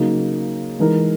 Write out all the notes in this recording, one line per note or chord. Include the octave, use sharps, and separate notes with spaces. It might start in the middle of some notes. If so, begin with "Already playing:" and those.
Already playing: C#3 F#3 A#3 D#4 F#4
E3 G#3 D#4 A#4